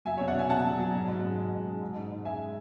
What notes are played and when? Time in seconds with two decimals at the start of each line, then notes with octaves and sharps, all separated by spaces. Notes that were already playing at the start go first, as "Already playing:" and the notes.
0.05 F#3 E5 G#5
0.17 C#5 E5
0.21 B2
0.28 D5 F#5
0.34 B2 E5 G#5
0.49 B2 F#5 A5
0.64 F#3
0.79 F#3
0.94 G#2
1.08 G#2
1.23 G#3
1.37 G#2
1.52 G#2
1.66 G#3
1.82 G#2
1.95 G#2
2.11 G#2
2.25 G#3 E5 G#5